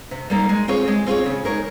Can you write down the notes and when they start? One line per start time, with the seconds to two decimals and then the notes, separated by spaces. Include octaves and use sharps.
0.11 C3
0.30 G3 A#3 D#4
0.49 G#3
0.68 C4 F4 G#4 C#5
0.88 G#3
1.06 C4 F4 G#4 C#5
1.26 C#3
1.45 G#3 D#4 A#4 C#5